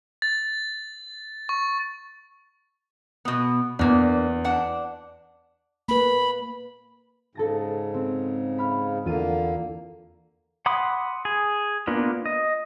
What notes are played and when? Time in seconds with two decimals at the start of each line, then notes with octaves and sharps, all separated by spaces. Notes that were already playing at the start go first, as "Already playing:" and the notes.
0.22 A6
1.49 C#6
3.25 B2 B3
3.79 E2 A#3 D4
4.45 D4 F#5
5.88 A#3 B4 B5
7.35 G#2 C#3 A4 A5 A#6
7.94 C4
8.58 F5 B5
9.05 E2 D3 A#3 F4 D#7
10.66 F#5 B5 C6 D6 D#6
11.25 G#4
11.87 A#3 B3 D4 F4
12.26 D#5